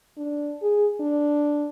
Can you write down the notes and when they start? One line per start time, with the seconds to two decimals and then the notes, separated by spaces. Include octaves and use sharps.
0.17 D4
0.62 G#4
1.00 D4